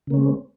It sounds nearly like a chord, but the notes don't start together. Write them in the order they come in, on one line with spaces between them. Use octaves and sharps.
C#3 A#3 C#4 G#3 C4